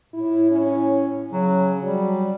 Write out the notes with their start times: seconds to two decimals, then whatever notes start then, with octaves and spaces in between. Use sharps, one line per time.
0.14 A2 E4
0.51 C#4
1.32 C#3 F#3
1.83 F#3 G3